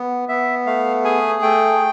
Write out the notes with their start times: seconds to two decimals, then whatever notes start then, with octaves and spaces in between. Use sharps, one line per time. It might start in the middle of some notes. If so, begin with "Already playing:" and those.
Already playing: B3
0.28 B3 E5
0.66 A3 F5
1.04 G#4 G#5
1.42 A3 G5